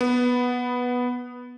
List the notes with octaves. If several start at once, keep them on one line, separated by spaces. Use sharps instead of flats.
B3